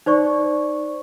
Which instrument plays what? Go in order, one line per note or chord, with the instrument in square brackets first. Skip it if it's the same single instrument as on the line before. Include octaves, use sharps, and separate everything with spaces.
[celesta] D#4 C5 D5 C#6